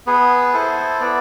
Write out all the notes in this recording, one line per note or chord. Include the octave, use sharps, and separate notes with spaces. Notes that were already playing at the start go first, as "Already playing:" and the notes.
B3 G#4 B4
E4 A4 C5
B3 B4 D5